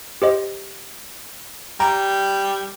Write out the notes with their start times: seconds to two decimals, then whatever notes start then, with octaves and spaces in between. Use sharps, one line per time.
0.22 G4 C5 D#5
1.80 G3 A#5